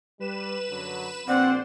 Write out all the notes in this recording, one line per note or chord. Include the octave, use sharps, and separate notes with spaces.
G3 B4 E7
F#2 D3 F#3
A#1 C4 C5 D5 F#5